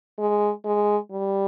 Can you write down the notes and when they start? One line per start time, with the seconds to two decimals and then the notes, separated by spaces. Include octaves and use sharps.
0.19 G#3
0.65 G#3
1.11 G3